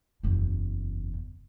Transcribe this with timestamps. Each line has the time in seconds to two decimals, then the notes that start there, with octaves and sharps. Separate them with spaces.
0.23 F#1 E2